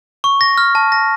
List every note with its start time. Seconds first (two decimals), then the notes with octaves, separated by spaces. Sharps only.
0.24 C#6
0.41 A#6
0.58 F6
0.75 A5
0.92 A#6